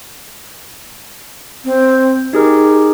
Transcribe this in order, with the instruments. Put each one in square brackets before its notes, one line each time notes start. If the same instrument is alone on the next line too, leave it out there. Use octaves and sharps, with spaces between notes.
[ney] C4
[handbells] D#4 G#4 A#4 [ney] G4